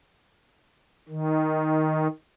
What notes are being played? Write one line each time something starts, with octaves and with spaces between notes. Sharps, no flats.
D#3